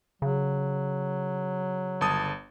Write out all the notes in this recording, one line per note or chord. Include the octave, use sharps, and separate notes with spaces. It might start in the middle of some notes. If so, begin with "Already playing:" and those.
C#3 F#3
G1 A5 D#6